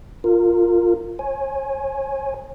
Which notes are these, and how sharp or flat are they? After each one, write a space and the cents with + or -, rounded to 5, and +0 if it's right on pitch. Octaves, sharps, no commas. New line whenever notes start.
F4 +0 A#4 -20
C#5 -40 G#5 +0